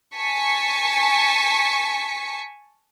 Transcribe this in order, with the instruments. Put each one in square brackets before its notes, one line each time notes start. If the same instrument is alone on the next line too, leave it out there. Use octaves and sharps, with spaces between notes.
[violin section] G#5 A5 C#6 B6 C#7